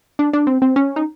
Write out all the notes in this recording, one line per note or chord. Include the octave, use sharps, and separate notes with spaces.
D4
D4
C4
C4
C#4
D#4